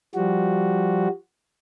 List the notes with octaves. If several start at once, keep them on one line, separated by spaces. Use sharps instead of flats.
F3 G3 F#4